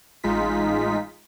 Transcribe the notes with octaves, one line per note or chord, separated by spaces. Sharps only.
A1 G#3 D#4 F4 B6